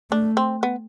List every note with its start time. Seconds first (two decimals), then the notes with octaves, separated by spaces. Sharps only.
0.11 A3 D4
0.37 C4
0.63 B3